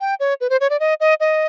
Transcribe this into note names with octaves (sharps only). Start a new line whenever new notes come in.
G5
C#5
B4
C5
C#5
D5
D#5
D#5
D#5